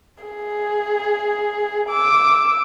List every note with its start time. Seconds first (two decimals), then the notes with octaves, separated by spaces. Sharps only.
0.23 G#4
1.89 D6 E6